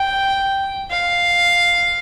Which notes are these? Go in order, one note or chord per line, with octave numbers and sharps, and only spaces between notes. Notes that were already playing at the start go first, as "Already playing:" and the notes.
Already playing: G5
F5